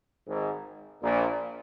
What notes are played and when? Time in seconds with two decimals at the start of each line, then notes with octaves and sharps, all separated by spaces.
0.26 G#1 G#2
1.02 A#1 A#2